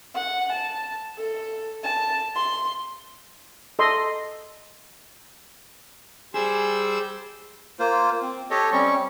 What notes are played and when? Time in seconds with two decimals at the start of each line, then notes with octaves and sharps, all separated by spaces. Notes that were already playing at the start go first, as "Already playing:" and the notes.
0.14 F#5
0.52 A5
1.17 A4
1.83 A5
2.35 C6
3.79 A4 D#5 C6
6.34 G3 G#4 C5 E6
7.79 A#3 F4 C5
8.22 C4
8.51 G4 A4 C#5 D#5
8.72 G3 C4 C#4 C#6